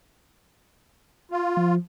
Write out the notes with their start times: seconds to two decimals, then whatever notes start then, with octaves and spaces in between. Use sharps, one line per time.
1.32 F4
1.57 F3